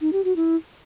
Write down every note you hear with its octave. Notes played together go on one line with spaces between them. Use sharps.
D#4
G4
F#4
E4